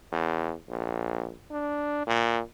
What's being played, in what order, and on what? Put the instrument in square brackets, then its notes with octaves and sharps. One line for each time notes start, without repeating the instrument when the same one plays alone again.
[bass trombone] E2
A#1
D4
A#2